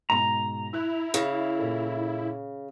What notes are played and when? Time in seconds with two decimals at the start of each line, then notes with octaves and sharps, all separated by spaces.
0.10 G#2 B2 G#3 A#5
0.73 E4 E6 F#6
1.14 C#3 G#4
1.59 A#2 A4